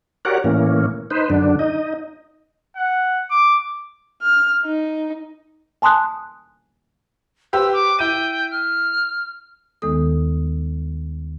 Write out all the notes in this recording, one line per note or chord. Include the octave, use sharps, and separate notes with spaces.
F#4 G4 A#4 C#5 D5 F#5
A2 E3 A#3 C#4
D#4 B4 C5
F#2 D3 D4
D#4 D#5
F#5
D6
F6
D#4
G#5 A5 C6 D#6 F#6
G4 B4 C5 E6
D6
E4 G5 D#7
F6
D#2 D#3 G#3 B3 A4 D#6